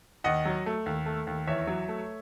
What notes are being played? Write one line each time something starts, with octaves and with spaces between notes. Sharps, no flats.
D#2 D#5 F#5
F#3
A3
D#2
A3
D#2
E2 C#5 E5
F#3
A3